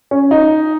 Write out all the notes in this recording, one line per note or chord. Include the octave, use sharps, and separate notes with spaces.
C#4
D#4